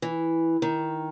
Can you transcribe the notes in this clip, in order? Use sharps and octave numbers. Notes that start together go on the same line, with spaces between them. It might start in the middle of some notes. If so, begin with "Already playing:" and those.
E3
D#3